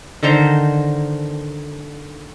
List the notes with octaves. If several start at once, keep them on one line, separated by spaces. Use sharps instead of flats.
D3 D#3 C5 A#5